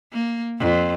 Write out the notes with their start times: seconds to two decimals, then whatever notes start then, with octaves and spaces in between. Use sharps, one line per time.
0.13 A#3
0.59 F2